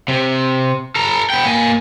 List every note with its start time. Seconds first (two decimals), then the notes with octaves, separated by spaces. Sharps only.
0.08 C3
0.96 A4 A#5
1.30 B3 G5
1.45 A#3 G#5